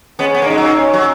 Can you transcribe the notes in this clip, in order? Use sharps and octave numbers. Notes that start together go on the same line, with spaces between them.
G#3 B3 C#4
B3
A#3
G#3 D#4
F#3 A#3
C#4
F#3